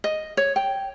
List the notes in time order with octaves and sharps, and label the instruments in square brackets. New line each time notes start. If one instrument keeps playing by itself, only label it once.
[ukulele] D#5
C#5
G5